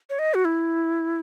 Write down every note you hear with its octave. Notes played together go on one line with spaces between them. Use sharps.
C#5
D#5
F#4
E4